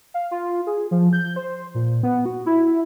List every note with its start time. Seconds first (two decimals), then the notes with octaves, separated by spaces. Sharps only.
0.14 F5
0.31 F4
0.67 G#4
0.91 F3
1.13 G6
1.36 C5
1.75 A#2
2.03 B3
2.26 F#4
2.46 E4